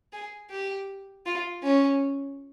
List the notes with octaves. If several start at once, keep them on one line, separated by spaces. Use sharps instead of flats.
G#4
G4
F4
C#4